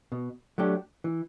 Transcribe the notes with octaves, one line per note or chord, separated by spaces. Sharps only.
B2
F#3 A3 D4 G4
E3